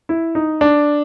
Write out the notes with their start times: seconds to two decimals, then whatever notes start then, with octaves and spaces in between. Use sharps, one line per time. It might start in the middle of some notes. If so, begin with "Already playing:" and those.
0.09 E4
0.35 D#4
0.61 D4